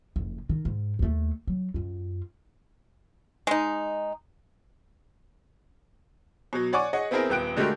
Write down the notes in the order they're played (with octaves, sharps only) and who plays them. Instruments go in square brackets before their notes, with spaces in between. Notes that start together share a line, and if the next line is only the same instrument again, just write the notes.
[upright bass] F#1 F2
D#3
G#2
D#2 A3
F#3
F#2 F4
[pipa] G#3 D#4
[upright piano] B2 F#3
C#5 D5 F#5 G#5 C#6 D6
G#4 C#5 D#5 F#5
B3 C4 E4 G#4 A#4 C5
D#1 B3 G5 F#6 D7
D3 G#3 A3 F#4 G4 A#4